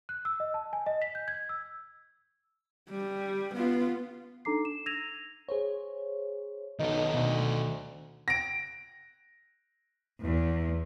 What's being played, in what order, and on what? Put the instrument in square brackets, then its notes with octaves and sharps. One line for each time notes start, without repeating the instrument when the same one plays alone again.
[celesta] F#6
E6
D#5
A5
G#5
D#5
B6
G6
G#6
E6
[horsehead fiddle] G3
B3 F4
[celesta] D4 D#4 A4 A#5 D6 C7
E7
E6 G#6 A#6 D#7 F7
[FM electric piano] G#4 C5 C#5
[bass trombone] B1 [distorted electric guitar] D#3 A4 [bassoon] D#4
[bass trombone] D2 [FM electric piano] B2
[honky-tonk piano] A#6 D7
[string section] E2